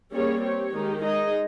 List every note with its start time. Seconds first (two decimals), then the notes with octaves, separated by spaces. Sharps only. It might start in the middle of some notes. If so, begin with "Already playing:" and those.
0.12 G3 A#3 C#4 G#4 C#5
0.42 C4 G4 C#5
0.73 D#3 G#3 D#4 G4
1.03 G#3 D#4 G#4 D#5